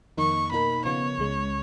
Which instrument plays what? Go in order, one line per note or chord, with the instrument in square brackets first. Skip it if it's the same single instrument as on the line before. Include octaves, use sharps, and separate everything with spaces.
[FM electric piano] F2 D#3 A#3 D#4 [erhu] C#6
[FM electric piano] B2 A#3 D#4 A#4 [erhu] B5
[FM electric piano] C#3 F3 B3 F4 [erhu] C#5
[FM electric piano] C#2 C#3 G#3